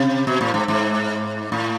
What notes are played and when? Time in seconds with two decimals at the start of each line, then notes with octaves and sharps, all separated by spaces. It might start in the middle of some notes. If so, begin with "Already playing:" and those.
Already playing: C3
0.27 B2
0.41 A2
0.54 G#2
0.68 G#2
1.52 A2